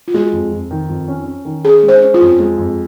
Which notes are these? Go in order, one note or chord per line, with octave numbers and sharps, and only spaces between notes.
F4
G#3 F#4
F2
F2
D#3
F2
C#4
C#4
D#3
C#4 G#4
G#3
C5
C#4
F4
F2
G#3
F2